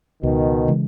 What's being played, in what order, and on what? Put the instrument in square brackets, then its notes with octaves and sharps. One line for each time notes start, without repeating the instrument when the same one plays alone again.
[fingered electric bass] C#2 [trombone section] B2 D#3
[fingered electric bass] C#3 E3 G#3